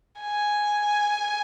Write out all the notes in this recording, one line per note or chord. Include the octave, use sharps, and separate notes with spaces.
G#5